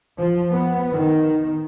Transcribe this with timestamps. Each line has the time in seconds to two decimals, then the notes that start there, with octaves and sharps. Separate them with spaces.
0.18 F3
0.53 B3
0.95 D#3